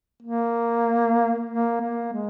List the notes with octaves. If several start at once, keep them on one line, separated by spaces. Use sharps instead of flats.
A#3
A#3
A#3
G#3